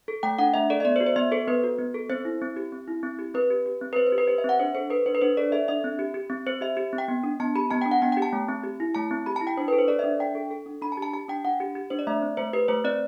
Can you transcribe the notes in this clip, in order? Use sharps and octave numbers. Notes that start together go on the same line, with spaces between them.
A4
A3 G5
D4 F#5
A3 E5
A4 D5
E5
B3 D5
C5
F#4
C5
B3 E5
A4 C5
B3 B4
F#4
B3
A4
C4 C5
E4
C4
G4
C4
E4
C4
G4
C4 B4
G4
G4
C4
B4
C4 C5
C5
G4
B4
G4 C5
E5
C4 F#5
D4 C5
A4 C5
A4 B4
D4 C5
B4
D4 C5
A4 D5
A4 E5
D4 E5
C4
G4
G4
C4
C4 C5
G4 E5
G4
C4
G5
B3
D4
B3 A5
G4 B5
B3 A5
G5
D4
F#5
B3 G5
G5
G4
A5
A3
C4
G4
E4
A3 A5
C4
G4 B5
A5
E4
G5
D4 C5
B4
A4
C5
A4 D5
E5
D4
D4 G5
A4
A4
D4
D4 B5
A5
G4
A5
G4 A5
D4 G5
D4 F#5
G4
G4
D4 C5
D5
A3 E5
C4
A3 C5
G4 B4
A3 C5
C4 D5